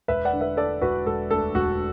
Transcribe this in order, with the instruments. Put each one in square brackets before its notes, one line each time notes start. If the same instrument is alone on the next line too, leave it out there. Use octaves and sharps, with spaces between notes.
[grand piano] E1 B4 E5
D5 F#5
D3
B4 E5
D3 A4 D5
E1 F#4 B4
E1 A4
D2 A4
E1 F#4